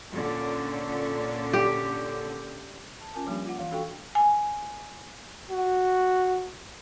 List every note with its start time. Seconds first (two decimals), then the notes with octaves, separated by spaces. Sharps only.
0.12 A#2 D3 C#4
1.53 G4
3.01 A5
3.14 C#4 F4 A#4 G#5 A5
3.27 F3 G3 A#3 D4 G4
3.45 F4 F#5
3.58 E3 F5
3.72 D4 F#4 A4 F5 G5 C#6
4.15 G#5
5.51 F#4